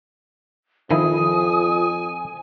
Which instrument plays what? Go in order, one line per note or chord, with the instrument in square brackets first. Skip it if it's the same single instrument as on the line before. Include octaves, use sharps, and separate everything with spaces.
[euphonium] F2 [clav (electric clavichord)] D#3 F3 E4 [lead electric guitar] G#5 [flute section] D#6